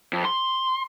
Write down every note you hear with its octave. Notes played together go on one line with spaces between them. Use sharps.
F2
C6